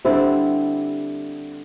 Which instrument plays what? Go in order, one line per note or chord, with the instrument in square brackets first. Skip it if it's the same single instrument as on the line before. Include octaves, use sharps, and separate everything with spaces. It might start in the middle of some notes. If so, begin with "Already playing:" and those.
[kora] D3 G3 C4 E4